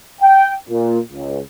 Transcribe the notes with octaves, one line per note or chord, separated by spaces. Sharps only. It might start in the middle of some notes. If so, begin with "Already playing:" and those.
G5
A#2
C#2